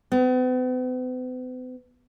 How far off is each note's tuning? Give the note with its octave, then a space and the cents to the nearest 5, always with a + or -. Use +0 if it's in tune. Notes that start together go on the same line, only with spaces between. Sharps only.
B3 +45